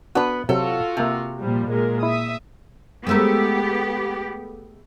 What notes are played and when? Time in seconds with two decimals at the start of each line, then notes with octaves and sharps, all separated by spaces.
0.15 B3 D4 F#4 B4
0.49 C3 F#3 F4 F#4 A4
0.97 C3 A#3 A4
1.39 A#2 F3 G3
1.70 A#2 G#3 A#4
2.03 E4 E5 D#6
3.07 G#3 A3 B3 G4 A#4